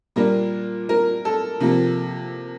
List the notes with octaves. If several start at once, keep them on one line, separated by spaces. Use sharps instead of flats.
A#2 G3 A#3 D4 A#4
A#4
A4
C3 F3 A#3